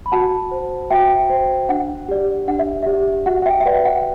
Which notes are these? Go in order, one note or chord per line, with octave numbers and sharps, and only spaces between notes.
B5
F#4 F#5 A5
C5
F#4 E5 G5
C5
D4 F#5
G4 D5
D4 F#5
E5
G4 D5 E5
F#4 F#5
F#5
E5 G5
E5
B4 D5 F#5
F#5